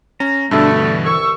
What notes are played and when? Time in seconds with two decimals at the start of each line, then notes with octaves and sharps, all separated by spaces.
0.20 C#4 A#5
0.51 G2 B2 D3 A3 D4
0.78 E3
1.05 C2 C#6 E6